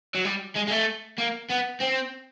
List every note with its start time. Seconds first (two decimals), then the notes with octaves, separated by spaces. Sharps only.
0.15 F#3
0.25 G3
0.55 G#3
0.67 G#3
0.71 A3
1.18 A#3
1.50 B3
1.80 C4